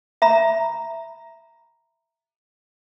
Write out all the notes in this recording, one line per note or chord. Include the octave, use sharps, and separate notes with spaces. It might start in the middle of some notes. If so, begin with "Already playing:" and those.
E5 A#5 B5